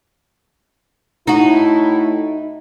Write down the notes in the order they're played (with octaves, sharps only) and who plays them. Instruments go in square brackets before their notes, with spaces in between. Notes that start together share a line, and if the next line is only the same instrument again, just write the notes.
[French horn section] A2 A3 E4 [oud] D#4 F#4